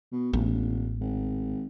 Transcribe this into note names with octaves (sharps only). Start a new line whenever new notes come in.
B2
E1 A1
G#1